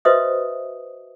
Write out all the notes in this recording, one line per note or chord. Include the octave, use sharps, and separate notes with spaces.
F#4 B4 C5 D#5 E5 D#6